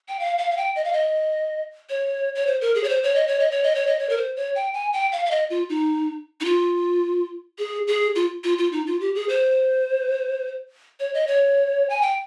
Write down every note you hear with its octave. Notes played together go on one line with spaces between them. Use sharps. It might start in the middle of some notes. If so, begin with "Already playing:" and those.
G5
F5
F5
F5
G5
D#5
F5
D#5
C#5
C#5
C5
A#4
G#4
C#5
C5
C#5
D#5
C#5
D#5
C#5
D#5
C#5
D#5
C#5
A#4
C5
C#5
G5
G#5
G5
F5
F5
D#5
F4
D#4
D#4
F4
G#4
G#4
F4
F4
F4
D#4
F4
G4
G#4
C5
C#5
D#5
C#5
G#5
G5